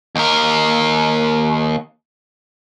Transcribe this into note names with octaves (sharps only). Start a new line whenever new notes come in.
D#2 A#4